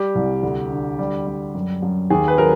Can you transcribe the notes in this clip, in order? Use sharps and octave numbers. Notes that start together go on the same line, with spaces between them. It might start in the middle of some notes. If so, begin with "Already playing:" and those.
Already playing: G3 G4
C2
D2
D3
G3
G3
F#2
F#2
D#2 G#4
B4
F#3 A#4